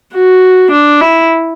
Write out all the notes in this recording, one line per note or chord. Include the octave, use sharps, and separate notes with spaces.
F#4
D4
E4